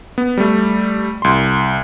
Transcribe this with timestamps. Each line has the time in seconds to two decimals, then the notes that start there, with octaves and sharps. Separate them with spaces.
0.18 B3
0.37 G3 A3
1.22 C2 C6